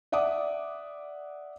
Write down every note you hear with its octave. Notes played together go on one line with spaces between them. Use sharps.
D5 E5 F#5 D6 D#6